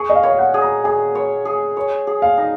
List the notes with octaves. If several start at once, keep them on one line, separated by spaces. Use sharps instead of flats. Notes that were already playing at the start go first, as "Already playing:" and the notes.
Already playing: G#4 C#6
D#5
F5
C#5
F5
F#5
G#4
A#5
G#4 G#5
C#5
G#4
C#5
G#4
F5
D#4